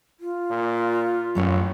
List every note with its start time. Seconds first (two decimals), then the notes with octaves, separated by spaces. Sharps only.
0.20 F4
0.50 A#2
1.35 A1 F#2 A3 C#4